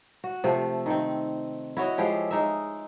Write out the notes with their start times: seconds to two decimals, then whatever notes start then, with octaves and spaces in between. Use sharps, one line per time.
0.24 F#4
0.44 C3 F3 A3
0.86 D#3 C4
1.77 E4 F#4 C#5 D#5
1.98 F3 G#3 E4 G4
2.31 G#3 D#4 E5